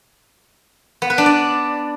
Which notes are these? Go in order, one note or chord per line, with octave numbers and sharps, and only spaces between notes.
B3
B4
D4
D5